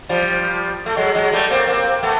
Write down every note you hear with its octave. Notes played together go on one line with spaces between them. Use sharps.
F3 G3
A3
F#3 G#3
F#3 G#3
G3 A3
A#3 C4
A#3 C4
A3 B3